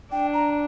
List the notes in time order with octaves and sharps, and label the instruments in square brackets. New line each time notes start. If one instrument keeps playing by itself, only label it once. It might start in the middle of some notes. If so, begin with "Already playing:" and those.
[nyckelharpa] D4 [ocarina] G5
[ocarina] A#5